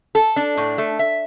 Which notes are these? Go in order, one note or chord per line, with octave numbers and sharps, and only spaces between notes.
A4
D4
A2
A3
E5